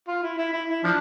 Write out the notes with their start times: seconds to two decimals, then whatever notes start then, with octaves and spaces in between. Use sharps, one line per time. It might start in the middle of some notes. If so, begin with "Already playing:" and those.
0.08 F4
0.23 E4
0.38 E4
0.53 E4
0.69 E4
0.84 F3 D4